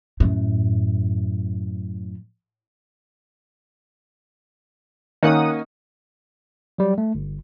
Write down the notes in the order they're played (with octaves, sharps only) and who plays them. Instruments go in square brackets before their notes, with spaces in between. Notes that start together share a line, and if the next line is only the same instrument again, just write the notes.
[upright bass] F#2 A2
[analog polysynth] D#3 F#5 D#6 [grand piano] A#3 C#4 D#4
[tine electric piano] F#3 G3
A3
G1